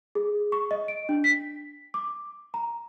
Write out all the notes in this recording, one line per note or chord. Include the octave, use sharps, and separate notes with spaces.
G#4
C#6
D#5
D7
D4
B6
D6
A#5